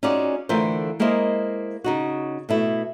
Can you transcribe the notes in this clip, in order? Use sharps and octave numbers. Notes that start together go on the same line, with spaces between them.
C#4 D#4 F4 F#4 G#4 D5
D3 E3 A3 F4 A#4 C5
G#3 A#3 E4 A#4 C5 D#5
C#3 D#4 F#4
B2 A3 E4